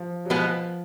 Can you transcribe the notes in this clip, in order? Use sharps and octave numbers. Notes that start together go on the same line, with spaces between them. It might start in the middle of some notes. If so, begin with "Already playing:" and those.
Already playing: F3
F#3
B2 F3 G#3 B3